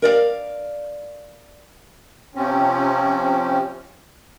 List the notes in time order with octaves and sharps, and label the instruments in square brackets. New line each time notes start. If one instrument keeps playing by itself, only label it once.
[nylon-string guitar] A#4 D5 D#5 F5
[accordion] C3 F3 C4 C#4